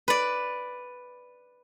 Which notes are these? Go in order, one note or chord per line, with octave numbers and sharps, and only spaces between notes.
B4 D5